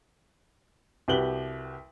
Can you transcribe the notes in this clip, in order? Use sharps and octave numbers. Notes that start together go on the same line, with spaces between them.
C2 F#4 G4 B4 F#7 G7